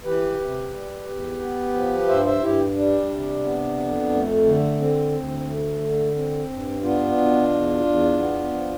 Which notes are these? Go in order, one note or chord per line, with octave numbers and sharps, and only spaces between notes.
E3 G4 B4
C3
G3
E2
B3
F3
G2 C5 E5
C5 E5
G2 E4 G4
G3 D4
C3
B3
F2
A3
D3
C4
D2
A3
D3
C4
G2
B3 D4 F4
B2
E2
E2
B3
F3